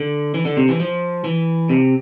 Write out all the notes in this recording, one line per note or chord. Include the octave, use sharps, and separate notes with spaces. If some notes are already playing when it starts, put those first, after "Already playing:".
Already playing: D3
E3
D3
C3
E3
F3
E3
C3